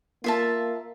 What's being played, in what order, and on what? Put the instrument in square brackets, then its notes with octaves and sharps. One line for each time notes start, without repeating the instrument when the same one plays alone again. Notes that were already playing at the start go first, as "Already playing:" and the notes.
[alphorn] A#3 [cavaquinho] F4 E5 A5